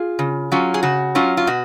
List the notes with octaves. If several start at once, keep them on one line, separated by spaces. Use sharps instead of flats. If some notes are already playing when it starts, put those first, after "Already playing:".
Already playing: F4 G#4
C#3
F#3 C#4 F4
G#4
C#3 F#4
F#3 C#4 F4
F4
B2 F#4